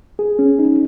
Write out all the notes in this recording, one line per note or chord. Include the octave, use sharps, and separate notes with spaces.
G#4
C#4
D#4